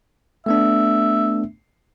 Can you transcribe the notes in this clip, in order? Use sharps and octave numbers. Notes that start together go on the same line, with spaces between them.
A3 B3 D4 E5